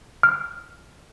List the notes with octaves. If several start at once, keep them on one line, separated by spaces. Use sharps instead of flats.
F6